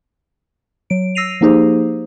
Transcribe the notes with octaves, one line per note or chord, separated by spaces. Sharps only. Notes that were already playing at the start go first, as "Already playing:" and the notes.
F#3 D7
E6 A#6 C7 D#7 F7
F3 A#3 D#4 G4 G#4 C5